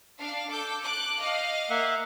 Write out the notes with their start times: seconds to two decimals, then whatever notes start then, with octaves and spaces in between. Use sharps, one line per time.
0.19 D4 F5
0.50 A4 D6 G6
0.84 D6 F#6
1.19 D#5 F5
1.70 A#3 E5 F#5